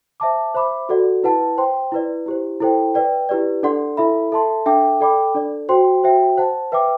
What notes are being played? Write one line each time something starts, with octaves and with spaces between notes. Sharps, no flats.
C5 E5 A5 D6
C5 E5 B5 D6
F#4 A4 D5 F#5
E4 B4 F#5 A5
C5 G5 C6
E4 B4 D5
E4 G4 C5
E4 A4 C5 G5
B4 D5 G5
E4 G4 B4 D5
D4 A4 D5 F#5 C6
E4 A4 E5 B5
A4 E5 A5 C6
D4 A4 E5 G5 D6
A4 D5 G5 B5 D6
D4 A4 D5
F#4 C5 G5 C6
F#4 C5 E5 G5
C5 F#5 A5
B4 E5 G5 D6